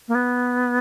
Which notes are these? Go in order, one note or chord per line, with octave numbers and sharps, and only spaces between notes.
A#3
B3